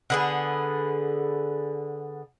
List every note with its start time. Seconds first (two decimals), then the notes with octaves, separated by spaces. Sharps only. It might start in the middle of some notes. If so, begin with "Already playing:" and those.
0.10 D3 B3 G#4